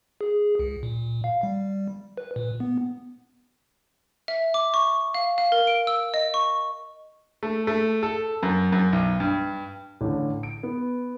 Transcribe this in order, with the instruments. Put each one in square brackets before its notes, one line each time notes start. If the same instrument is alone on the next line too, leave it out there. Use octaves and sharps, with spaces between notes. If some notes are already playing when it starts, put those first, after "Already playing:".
[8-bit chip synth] G#4
C#2
A#2
F5
G3
B4
A#2
B3
[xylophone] E5
D6
C#6
F5
F5
A#4
D7
E6
D#5
C#6
[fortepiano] A3
A3
A4
F#2
F#2
B1
G2
[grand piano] A1 D3
D7
B3